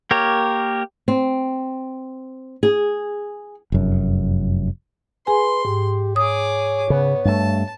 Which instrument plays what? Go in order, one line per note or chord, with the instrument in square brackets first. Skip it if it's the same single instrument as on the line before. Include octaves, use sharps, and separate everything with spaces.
[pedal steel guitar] A#3 G4 A#4 C#5
[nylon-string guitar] C4
G#4
[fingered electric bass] F1 F#2
[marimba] G#4 G#5 [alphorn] B4 [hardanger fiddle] C6
[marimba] G#2 [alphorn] G4
[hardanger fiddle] G#4 D6 [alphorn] C#5 [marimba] D#6
[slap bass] C#3 [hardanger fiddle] B3
[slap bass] G2 A3 [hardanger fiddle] A5